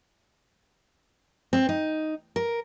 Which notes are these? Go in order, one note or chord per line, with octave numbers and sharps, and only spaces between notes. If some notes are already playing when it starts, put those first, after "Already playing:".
C4
D#4
A#4